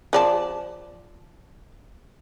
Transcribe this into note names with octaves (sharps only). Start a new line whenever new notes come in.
F3 D5 A5